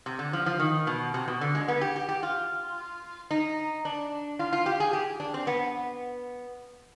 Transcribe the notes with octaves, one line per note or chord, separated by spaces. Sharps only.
C3
D3
F3
F3
D#3
B2
C3
B2
D3
G#3
B3
G4
G4
G4
F4
D#4
D4
F4
F4
G4
G#4
G4
D4
C4
B3